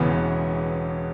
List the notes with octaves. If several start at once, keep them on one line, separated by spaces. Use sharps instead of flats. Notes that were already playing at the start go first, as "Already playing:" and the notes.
Already playing: E1 E2 C#3 E3 B3